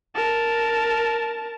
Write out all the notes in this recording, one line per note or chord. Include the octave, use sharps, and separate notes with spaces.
A#4 A5